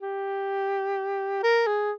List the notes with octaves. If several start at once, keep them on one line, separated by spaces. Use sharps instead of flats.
G4
A#4
G#4